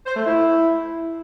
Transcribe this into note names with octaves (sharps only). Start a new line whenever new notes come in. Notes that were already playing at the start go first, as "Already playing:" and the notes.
C5
A3
E4